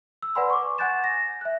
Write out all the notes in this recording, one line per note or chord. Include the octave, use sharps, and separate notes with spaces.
E6
B4 D5 F#5 G#5 B5 C6
C#6 D6
F#5 G#5 F#6 G6 A6 E7
A#6
E5 F#6